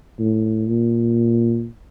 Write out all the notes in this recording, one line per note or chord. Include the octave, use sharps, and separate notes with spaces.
A2
A#2